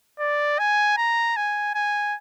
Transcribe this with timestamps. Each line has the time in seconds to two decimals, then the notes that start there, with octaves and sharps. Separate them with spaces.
0.20 D5
0.59 G#5
0.97 A#5
1.36 G#5
1.75 G#5